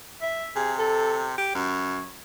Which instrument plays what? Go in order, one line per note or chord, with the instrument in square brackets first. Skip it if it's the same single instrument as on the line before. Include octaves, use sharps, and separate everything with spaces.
[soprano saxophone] E5
[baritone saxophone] C3 [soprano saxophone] G#4
[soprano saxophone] A4
[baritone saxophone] G4
[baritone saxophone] F#2 [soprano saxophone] C#5